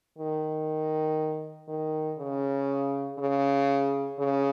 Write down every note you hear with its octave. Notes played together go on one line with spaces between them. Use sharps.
D#3
D#3
C#3
C#3
C#3